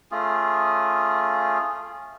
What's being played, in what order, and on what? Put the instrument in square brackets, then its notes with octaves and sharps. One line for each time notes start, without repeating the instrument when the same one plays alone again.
[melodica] A3 C#4 F4 G#4